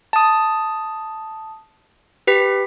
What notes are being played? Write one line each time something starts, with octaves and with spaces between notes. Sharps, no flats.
A5 D#6
G4 B4 B6